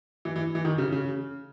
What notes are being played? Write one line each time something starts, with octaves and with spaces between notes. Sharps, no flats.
E3
E3
E3
D#3
C#3
C#3